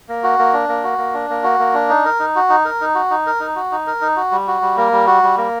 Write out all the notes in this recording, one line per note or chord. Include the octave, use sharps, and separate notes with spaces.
A#3
F#4
A#3
D4
A#3
F#4
A#3
D4
A#3
F#4
A#3
D4
D#4
A#4
D#4
F#4
D#4
A#4
D#4
F#4
D#4
A#4
D#4
F#4
D#4
A#4
D#4
F#4
G3
F#4
G3
A#3
G3
F#4
G3
A#3